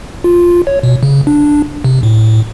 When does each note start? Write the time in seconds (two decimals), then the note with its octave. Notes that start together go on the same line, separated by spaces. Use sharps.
0.24 F4
0.67 C#5
0.83 B2
1.03 C#3
1.27 D4
1.84 C3
2.03 A2